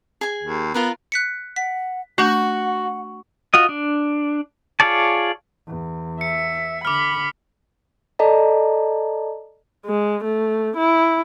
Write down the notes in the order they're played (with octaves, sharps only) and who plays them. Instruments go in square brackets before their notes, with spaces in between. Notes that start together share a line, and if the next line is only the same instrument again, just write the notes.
[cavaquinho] G#4 G#5
[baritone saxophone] D#2
[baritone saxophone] B3 [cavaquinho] F4 A#4 B4
[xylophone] F#6 B6 C#7
[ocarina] F#5 [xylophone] B6
[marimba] A3 D4 G6 [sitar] F#4 [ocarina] F#5
[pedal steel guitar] F4 F#4 D#5
D4
F4 G#4 C#5 D5 A5
[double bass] E2
[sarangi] E5 [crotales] C#7
[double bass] D3 [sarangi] B5 [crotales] D6 F6
[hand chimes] A4 D5 D#5 A5 A#5
[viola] G#3
A3
E4